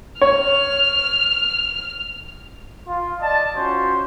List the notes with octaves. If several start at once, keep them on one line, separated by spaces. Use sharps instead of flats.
C#5 F6
F4
D5 D#5 A5
C#4 F4 F#4 C5